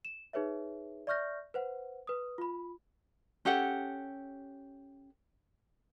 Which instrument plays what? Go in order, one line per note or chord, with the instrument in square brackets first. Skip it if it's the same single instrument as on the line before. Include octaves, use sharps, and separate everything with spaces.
[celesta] E7
D#4 G#4 B4 C#5 E5
D5 E5 C#6 F6 G6 A#6
B4 C5 F#5
B4 D#6
F4 B5
[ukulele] C#4 G4 A4 F#5